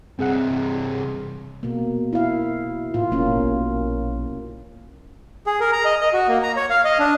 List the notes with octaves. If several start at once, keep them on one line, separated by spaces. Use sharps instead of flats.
G2 C3 C4 G#4 F#5
B2 A#3
E4 F5
A2 F4
F#1 B2 A#3 C#4
A#1
G#4
A#4
A#5
D#5
D#5
F#4
A#3
A#5
C#5
F5
D#5
D4